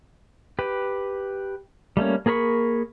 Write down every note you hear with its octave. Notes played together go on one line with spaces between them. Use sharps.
G4 B4
G3 A3 A#3 C#4
A#3 G#4 A#4 B5 C#6